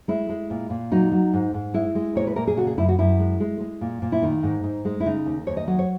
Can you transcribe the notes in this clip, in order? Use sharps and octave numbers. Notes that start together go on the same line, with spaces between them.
G#3 E4
G#3
A#2
A#2
F#3 D#4
F#3
G#2
G#2
G#3 E4
G#3
A#2 C#5
B4
A#2 A#4
G#4
C#3 F#4
G#4
F#2 E4
F#4
F#2 E4
G#3
G#3
G#3
A#2
A#2
E4
D#3 D#4
G#2
G#2
G#3
E4
C#3 D#4
D#2
D#2 C#5
D#5
F#3 D#5
C#5